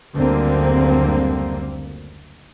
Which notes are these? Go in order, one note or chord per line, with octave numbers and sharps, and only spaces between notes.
F#1 D2 D3 G3 A#3 C4